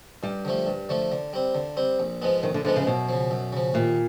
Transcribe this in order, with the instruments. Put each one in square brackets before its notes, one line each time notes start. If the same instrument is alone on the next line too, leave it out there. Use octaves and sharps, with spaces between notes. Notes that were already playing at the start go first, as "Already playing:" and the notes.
[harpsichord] G2 [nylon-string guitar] G3
[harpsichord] D3 F3 A3
G2
D3 F3 A3
D3
G3 C4
D3
G3 C4
A#1
G#2 F3 G#3 B3
[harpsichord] A#1 [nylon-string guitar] D#3
[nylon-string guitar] D3
[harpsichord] G#2 F3 G#3 B3 [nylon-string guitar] D3
[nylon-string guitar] C#3
[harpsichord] F#2 [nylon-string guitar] B2
[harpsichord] C#3 F3
F#2
C#3 F3
[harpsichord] D#2 [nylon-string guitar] A#2